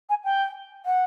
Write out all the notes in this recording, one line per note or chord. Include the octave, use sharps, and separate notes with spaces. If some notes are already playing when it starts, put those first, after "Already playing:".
G#5
G5
F#5